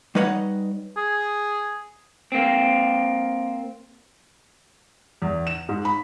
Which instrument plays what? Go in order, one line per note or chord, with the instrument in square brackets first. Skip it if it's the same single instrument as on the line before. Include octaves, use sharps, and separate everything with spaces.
[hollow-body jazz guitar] G3 D#4 B4 C#5 D#5 F#5
[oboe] G#4
[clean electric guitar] A#3 C4
[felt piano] E2
E7
G#2
B5